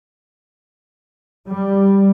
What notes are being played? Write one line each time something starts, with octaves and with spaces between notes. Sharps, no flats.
G3